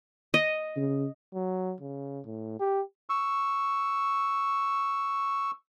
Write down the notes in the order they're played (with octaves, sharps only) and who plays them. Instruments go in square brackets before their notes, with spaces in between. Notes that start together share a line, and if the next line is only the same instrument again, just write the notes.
[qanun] D#5
[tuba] C#3
[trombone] F#3
C#3
A2
G4
[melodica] C#6 E6